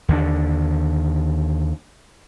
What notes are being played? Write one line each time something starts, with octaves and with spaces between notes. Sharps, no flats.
D#2 D3 A#3 D4